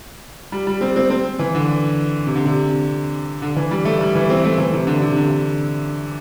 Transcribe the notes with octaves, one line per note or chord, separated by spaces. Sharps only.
G3
G3
C4
C4
C4
E3
D3
C3
D3
C3
D3
E3
G3
A3
G3
E3
C4
A3
E3
C3
D3
C3
D3